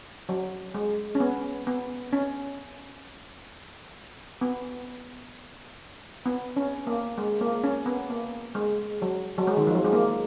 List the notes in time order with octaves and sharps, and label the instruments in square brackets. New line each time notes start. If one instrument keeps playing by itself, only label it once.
[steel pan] F#3
G#3
C#4
B3
B3
C#4
B3
B3
C#4
A#3
G#3
A#3
C#4
B3
A#3
G#3
F#3
F#3
G#3
D#3
F3
F#3
G#3
A#3